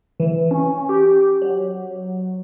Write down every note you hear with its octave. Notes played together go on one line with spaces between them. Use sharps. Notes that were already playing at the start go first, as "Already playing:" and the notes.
E3
C#4
G4
F#3